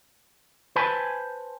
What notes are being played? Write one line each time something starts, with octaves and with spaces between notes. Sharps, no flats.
B4 C5 G#5 A5 B5